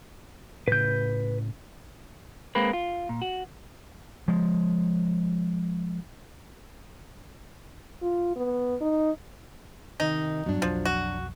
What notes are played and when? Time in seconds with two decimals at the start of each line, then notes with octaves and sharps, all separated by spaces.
0.68 A2 C#3 B4 G6
2.55 G#3 A#3 C4 B4
2.73 F4
3.09 A#2
3.22 F#4
4.28 F3 G#3
8.02 F4
8.36 B3
8.81 D#4
10.00 C3 D#3 D#4
10.46 G2 F#3 G3 B3 D4
10.62 B1 F2 F3
10.85 F#4